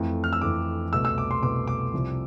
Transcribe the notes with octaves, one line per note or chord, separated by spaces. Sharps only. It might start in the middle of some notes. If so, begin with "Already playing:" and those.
Already playing: F2 E3 A3
F6
E6
F2 E3 A3 D6
C2 B2 A3 E6
E6
D6
C6
C2 B2 A3 D6
D6
C2 C3 F3